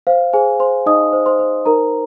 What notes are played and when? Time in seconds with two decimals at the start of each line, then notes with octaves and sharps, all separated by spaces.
0.07 C5 F5
0.33 G#4 C5 G#5
0.60 C5 C6
0.86 D#4 D#5 D#6
1.13 C5
1.26 C5 C6
1.39 C5
1.65 D#4 A#4 A#5